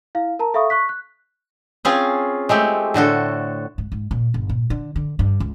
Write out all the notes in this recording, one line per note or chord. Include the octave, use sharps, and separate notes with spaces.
E4 F5
A#4 A5 A#5
A4 E5 F5 B5 C#6 D#6
C#6 F#6 B6
F#6
C4 C#4 F4 G#4 F5
G#3 A3 C4 G4
A2 D3 F#4 A4
G#2
G#2
A#2
G1
A#2
D3
D3
G2
C#2